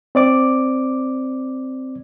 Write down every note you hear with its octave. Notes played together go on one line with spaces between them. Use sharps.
C4 D5 D6